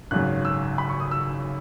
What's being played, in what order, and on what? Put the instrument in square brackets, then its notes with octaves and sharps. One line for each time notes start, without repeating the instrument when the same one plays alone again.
[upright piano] G#1 F#2 C#3 F#6
E6
B5
C#6
D#6
E6